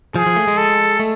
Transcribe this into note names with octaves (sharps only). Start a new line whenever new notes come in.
F3 G#4
F3
A3
G#3
A4
A3